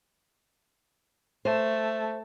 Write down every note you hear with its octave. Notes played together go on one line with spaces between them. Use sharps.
A3 C5